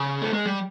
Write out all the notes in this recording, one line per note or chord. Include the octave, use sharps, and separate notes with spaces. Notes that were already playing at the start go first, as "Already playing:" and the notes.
Already playing: C#3
A3
G#3
G3